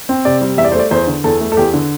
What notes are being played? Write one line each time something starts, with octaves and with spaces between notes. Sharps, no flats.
C4
C3 D5
G3
E2 E5
D5
C5
A3 D5
E2 C5
D3
E2 A4
A3
A4
E2 G4
D3